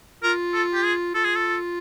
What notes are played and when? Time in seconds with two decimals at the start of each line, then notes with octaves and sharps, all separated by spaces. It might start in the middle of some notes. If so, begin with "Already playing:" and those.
0.23 F4 A#4
0.54 A4
0.74 G4
0.84 G#4
1.14 F4 A4
1.24 G#4
1.35 A4